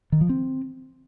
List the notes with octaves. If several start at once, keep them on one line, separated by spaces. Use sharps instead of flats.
D#3
F3
C4